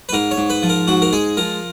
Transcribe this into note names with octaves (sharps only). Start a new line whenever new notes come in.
B4
G#2 A#4
C#5
G#2
B4
F3
A#4
G#2 F#4
A#4
G#3 G#4
F3 A#4